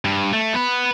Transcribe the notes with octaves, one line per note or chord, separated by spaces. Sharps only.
G2
A3
B3 B4